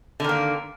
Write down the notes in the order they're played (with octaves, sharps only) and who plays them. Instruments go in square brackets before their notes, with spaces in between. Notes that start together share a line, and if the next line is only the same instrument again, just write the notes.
[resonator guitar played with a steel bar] D3
D#3
A#3